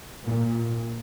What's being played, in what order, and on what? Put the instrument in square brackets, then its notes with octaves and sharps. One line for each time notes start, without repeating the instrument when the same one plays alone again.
[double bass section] A#2